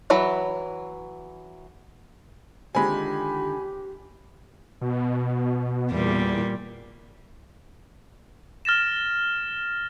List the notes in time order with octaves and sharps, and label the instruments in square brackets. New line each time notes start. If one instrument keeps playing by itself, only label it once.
[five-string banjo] E3 F#3 B5
[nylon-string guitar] D3 D#3 F4 [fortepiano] G#3 C4 [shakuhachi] G4 [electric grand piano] G#5 B5
[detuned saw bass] B2
[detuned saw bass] E2 [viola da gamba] A#2 G3
[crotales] F6 A6 A#6 E7